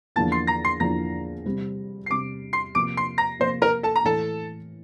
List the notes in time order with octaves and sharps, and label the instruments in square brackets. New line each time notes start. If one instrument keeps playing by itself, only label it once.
[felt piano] E2 D3 F3 A#3 E4 [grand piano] A5 A6
[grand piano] C6 C7
A#5 A#6
C6 C7
[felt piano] E2 D3 F3 A#3 E4 [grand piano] A#5 A#6
[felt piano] C3 G3 C4
[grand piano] C7
[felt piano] C3 G3 C4 [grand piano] D6 D7
[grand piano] C6 C7
[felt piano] C3 F3 A#3 [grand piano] D6 D7
[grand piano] C6 C7
A#5 A#6
[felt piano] C3 F3 A#3 [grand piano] C5 C6
[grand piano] A#4 A#5
A4 A5
A#5
[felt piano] A2 E3 A3 [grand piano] A4 A5